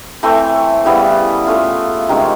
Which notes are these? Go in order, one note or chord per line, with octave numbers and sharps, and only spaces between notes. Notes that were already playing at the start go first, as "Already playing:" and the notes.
E3 A3 C4
C#3 E3 G3 B3
A3 C#4 F4
C3 D#3 G#3 C#4